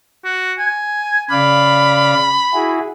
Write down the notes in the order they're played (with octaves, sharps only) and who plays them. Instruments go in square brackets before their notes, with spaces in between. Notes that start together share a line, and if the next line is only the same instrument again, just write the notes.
[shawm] F#4
G#5
[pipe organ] C#3 D5 F5 [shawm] B5
[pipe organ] E4 F#4 G#4